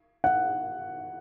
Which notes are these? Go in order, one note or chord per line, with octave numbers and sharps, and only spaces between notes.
F#5